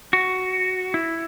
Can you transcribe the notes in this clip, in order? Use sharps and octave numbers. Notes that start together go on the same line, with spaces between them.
F#4
E4